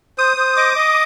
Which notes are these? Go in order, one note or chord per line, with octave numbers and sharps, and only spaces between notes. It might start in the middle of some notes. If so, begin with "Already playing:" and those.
C5 D#6
C5
D#5 D6
D#5